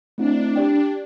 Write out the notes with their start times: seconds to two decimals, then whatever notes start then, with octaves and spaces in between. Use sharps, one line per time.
0.18 A3 C4 D4 E4
0.56 G4 D5 G5